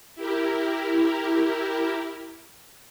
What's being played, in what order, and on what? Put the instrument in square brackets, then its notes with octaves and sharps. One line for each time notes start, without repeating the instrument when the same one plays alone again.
[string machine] E4 G4 A#4